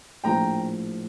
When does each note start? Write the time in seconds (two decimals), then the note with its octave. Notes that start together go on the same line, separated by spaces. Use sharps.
0.24 A#1 A2 F3 G5 A#5